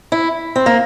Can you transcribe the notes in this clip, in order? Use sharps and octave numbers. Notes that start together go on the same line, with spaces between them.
E4
C4
A#3